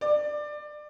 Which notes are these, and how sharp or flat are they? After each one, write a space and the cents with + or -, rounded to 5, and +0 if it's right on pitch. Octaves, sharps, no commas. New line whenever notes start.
D5 +20